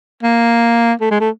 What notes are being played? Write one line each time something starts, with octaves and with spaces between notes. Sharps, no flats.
A#3
A3
G#3
A3